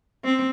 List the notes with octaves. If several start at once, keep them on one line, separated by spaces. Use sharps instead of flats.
C4